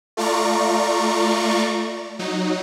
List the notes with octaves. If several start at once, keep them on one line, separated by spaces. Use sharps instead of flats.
A3 F4 D5 A#5 C#6
F#3 D#4